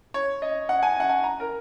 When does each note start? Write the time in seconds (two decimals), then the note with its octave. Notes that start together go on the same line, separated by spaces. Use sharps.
0.14 C#5
0.42 D#5
0.69 F#5
0.83 G#5
1.00 F#5
1.09 G#5
1.24 A#5
1.40 A#4